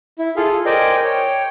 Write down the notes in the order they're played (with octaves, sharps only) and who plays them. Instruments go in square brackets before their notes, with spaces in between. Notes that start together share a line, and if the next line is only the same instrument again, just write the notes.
[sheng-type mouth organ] E4
F4 G#4 A4 F5
A#4 C5 D5 D#5 G5 G#5
C#5 G5